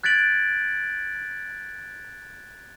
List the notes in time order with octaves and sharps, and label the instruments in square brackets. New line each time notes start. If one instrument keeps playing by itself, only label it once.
[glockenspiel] F#6 G#6 A6 B6 D7 F#7